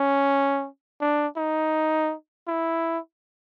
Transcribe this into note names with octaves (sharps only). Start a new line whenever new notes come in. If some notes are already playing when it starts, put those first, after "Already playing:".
Already playing: C#4
D4
D#4
E4